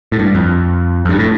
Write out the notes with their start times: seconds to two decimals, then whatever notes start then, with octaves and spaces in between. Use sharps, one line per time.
0.12 A2
0.19 G2
0.35 F2
1.05 F2
1.09 G2
1.19 A2